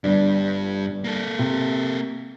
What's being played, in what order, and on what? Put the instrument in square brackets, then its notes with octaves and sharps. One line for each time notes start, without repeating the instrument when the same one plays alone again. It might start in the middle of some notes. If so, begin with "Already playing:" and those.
[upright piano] G1 D4 [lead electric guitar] G2 G3
[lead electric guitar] A#3 A4
[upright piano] C3